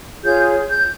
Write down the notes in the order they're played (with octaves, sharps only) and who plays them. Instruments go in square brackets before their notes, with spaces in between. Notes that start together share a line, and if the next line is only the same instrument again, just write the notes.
[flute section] F4 G#4 C#5 G6
G6